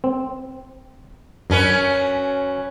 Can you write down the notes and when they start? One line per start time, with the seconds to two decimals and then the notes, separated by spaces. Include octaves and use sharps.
0.04 C4
1.50 F#2 F#3 C#4 B4